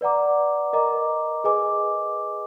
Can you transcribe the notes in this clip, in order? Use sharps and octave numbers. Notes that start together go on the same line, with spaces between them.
B4 D5 F#5 A#5 D6
A#4 D#5 A#5 D6
G#4 B4 D#5 G#5 D6